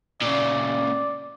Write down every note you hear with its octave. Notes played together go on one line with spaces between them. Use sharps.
A#2 C#3 D5